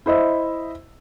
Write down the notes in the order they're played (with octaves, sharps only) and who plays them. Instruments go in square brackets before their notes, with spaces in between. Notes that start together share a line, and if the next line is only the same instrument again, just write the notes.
[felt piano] E4 C5 D#5 E5